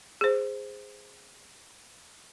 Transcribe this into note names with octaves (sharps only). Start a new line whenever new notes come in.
G#4 C5